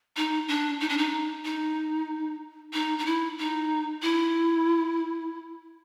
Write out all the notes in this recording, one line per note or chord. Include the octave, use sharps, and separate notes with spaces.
D#4
D4
D#4
D4
D#4
D#4
D#4
D#4
E4
D#4
E4